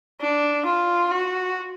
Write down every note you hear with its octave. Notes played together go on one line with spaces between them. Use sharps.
D4
F4
F#4